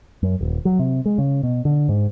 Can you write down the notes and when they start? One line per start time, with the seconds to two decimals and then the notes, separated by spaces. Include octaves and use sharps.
0.23 F#2
0.41 D#1
0.65 F#3
0.79 C3
1.06 G#3
1.18 C#3
1.43 B2
1.65 D3
1.89 G#2